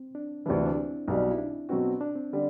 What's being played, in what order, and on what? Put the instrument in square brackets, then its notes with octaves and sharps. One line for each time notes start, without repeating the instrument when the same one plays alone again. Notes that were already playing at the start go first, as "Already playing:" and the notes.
Already playing: [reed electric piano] C4
D4
[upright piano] D2 C3 E3 [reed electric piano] D4
[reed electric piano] E4
D4
C4
[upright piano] B1 B2 G3
[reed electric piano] E4
D4
[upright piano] B2 F#3 C4 F#4
[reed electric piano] D4
C4
[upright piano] D3 G3